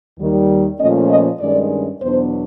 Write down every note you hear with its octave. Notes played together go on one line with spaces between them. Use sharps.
D#2 D#3 G3
A#2 F3 A3 C#4 D#5
D#5
G2 D#3 G#3 C#4 D5
E2 B2 F#3 B3 D4 C5